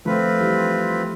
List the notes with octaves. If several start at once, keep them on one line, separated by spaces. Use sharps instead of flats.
F3 A3 C4 F4 B4
E3 G3